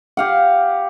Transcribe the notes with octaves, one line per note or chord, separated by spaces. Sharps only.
G4 F5 F#5